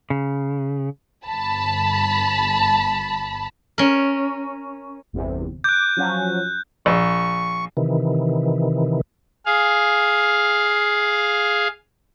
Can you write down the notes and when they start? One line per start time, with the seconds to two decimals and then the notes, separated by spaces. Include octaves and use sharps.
0.10 C#3
1.26 G1 A5 B5
3.78 C#4 A#4
5.13 G1 E2 C3
5.64 D6 F#6 G6
5.97 F3 F#3 C#4
6.86 A#1 C#6
7.77 C3 D#3 E3
9.46 G#4 F5